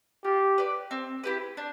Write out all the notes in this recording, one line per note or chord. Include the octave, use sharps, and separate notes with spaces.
F4 G4
B4 D5
C4
E4 G4 B4
D4